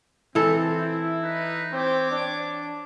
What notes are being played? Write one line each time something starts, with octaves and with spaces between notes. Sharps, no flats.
E3 C4 A4
E4
D#4 B4
C4 C#5 D6
D4